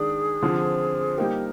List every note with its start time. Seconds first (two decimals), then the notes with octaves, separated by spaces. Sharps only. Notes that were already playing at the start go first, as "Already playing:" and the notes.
Already playing: D#3 G#3 D4 G#4 D5
0.42 D3 F3 C4 F4
1.18 G3 A#3 D#4 G4 A#4